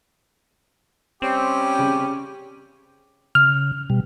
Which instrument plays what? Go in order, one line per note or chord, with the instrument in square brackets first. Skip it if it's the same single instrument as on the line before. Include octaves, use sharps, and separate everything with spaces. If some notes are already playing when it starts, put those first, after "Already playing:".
[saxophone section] G3 C#4 [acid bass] C4 [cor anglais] G4
[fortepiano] C#3
[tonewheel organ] C#3 [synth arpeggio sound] F6
[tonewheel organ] B2 G3